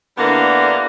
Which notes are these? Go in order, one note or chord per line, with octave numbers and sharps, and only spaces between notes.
D3 G3 A#3 B3 D4 E4